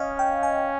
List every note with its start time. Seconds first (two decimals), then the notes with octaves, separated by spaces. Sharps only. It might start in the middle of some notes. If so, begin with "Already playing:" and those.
Already playing: C#4 D#5 F5
0.19 G5
0.43 G#5